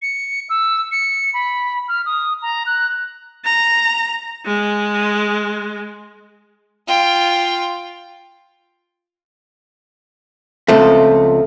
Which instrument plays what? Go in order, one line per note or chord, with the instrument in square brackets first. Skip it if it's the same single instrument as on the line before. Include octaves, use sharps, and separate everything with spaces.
[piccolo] C#7
E6
C#7
B5
F6
D#6
A#5
F#6
[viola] A#5
G#3
[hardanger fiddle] F4 G5
[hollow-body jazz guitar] C#2 F3 A3 [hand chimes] C4 A4 E5